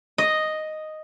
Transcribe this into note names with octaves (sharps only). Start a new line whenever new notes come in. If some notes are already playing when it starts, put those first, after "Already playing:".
D#5